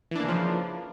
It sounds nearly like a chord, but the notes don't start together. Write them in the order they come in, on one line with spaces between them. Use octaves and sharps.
E3 D4 A#3 C#3 F3